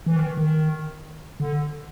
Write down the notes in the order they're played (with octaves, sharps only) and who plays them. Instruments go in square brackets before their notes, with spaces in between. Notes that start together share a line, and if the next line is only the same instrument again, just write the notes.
[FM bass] E3
D#3
D#3
D3